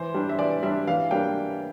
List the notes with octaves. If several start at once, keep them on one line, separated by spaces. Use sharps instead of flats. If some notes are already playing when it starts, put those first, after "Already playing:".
Already playing: E3 C5
G3 D4
E5
E3 D5
G3 D4 E5
E3 F5
G3 A#3 D4 G5